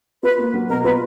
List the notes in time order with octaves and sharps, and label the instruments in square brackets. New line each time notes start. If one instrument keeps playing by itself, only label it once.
[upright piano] F4 [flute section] B4
[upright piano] A#3
F#3
[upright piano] B2 [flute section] A#4
[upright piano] F4 [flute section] B4